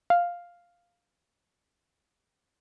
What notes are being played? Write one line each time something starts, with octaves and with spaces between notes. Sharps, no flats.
F5